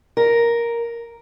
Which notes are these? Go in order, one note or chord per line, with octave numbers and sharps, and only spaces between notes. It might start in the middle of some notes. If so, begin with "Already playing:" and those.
A#4